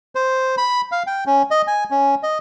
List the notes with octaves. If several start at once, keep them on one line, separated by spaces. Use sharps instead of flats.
C5
B5
F5
G5
C#4
D#5
G#5
C#4
D#5